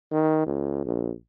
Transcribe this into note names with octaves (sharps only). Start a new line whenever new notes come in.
D#3
C#2
A#1